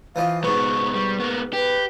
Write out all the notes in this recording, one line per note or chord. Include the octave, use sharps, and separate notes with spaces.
E3 F3 D#5 F5
C#2 G#2 B2 B3 C#6
G3
A#3 B3
G4 B4